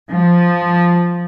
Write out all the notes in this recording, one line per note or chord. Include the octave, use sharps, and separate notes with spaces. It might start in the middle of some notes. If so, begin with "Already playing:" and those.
F3